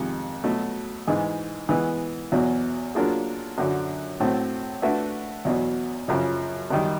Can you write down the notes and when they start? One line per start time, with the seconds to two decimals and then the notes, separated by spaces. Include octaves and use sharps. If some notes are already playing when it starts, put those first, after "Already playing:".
Already playing: F2 C3 D#3 G#3
0.44 B2 F#3 A3
1.07 G#2 E3 G#3
1.69 E3 G#3 B3
2.32 E2 B2 F#3
2.95 F#3 A#3 D4 F4 G#4
3.58 F#2 D3 F#3
4.20 A2 F#3 A3 C4
4.82 A3 D4 F#4 B4 E5
5.45 E2 B2 F#3
6.08 F#2 C#3 F3
6.71 F#2 D#3 G3